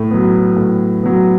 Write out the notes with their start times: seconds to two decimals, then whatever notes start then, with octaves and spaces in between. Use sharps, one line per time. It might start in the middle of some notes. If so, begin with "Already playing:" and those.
Already playing: A2
0.11 F#3 B3
0.57 A2
1.03 F#3 B3